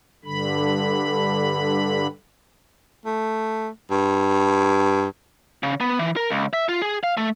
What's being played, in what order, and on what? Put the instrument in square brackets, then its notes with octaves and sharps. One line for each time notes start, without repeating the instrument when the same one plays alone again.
[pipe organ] G2 D3 B5
[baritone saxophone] A3
G2
[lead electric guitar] C#3
B3
E3
A#4
C#2
E5
F4
G#4
F5
A3